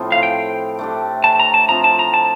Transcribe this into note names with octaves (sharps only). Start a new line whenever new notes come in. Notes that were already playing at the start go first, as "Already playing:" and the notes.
Already playing: A2 F3 C4
F5
G5
A3 D4 G4
A5
A#5
A5
F3 C4 F4 A#5
A5
A#5
A5